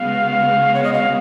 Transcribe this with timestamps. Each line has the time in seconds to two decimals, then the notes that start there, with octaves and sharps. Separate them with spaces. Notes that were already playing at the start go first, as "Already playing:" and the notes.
Already playing: C#3 G#3 B3 F#4 F5
0.74 C#5
0.84 D#5
0.94 F5